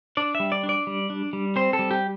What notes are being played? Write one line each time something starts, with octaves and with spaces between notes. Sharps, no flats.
D4 D5
E5
G3
D5
D4
D5
G3
D4
G3
C4 C5
A4
G3
G4